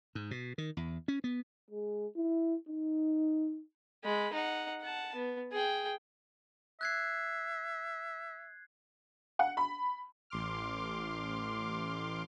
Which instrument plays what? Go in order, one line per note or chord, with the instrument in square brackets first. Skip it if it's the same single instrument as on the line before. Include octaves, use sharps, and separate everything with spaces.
[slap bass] G#2
B2
D#3
E2
C#4
B3
[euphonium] G#3
E4
D#4
[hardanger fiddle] G#3 B5
D#4 F#5
F#5 A5
B3
G#4 G5
[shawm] E5 [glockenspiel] F#6 G#6 C7
[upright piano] F#5
B5
[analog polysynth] A1 C6 D6 F6